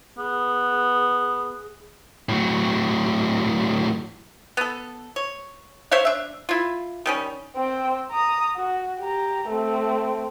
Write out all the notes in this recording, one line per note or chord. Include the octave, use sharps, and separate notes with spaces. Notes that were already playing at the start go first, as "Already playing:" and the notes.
B3 G#4
A2 F#3
B3 A4
C#5
C5 C#5 E5 F5
D4 E5
E4 F4
D#3 G3 C#4
C4 G5
A#5 D#6
F#4
G4 A#5
A3 C4